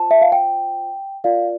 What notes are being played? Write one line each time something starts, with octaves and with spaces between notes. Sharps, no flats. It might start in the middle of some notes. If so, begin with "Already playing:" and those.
Already playing: F4 C5 A5
E5
F5
G5
F4 A#4 D5 F5